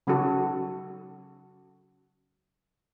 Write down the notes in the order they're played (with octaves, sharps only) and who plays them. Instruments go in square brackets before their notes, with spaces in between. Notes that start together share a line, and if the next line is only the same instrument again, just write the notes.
[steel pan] C#3 F#3 C#4 D#4 F#4 A4